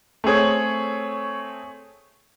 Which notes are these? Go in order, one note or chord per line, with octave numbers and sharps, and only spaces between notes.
A3 C4 G#4 C#5